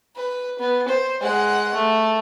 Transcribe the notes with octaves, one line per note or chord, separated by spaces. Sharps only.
B4
B3
C5
G#3 F#5
A3